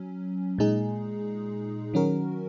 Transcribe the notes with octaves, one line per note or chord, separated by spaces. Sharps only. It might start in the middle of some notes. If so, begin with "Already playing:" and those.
Already playing: F#3 C#4
A#2 G#3 D#4 G#4
D#3 F#3 C#4 F#4 A#4